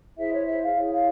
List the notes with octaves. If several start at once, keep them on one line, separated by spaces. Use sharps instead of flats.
E4 G#4 C5 E5
C#5
E5
F5
E4 G#4 C#5
F5